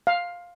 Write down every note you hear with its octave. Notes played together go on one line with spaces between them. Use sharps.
F5